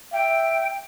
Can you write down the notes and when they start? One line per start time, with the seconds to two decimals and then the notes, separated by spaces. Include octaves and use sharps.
0.13 E5 G5